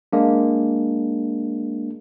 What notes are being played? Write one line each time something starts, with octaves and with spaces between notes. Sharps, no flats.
G#3 A#3 D4